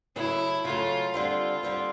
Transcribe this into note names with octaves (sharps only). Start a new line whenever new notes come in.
C#3 F#3 A3 E4
C#3 F#3 A3 F4
D3 G3 C4 F4
D3 G3 C4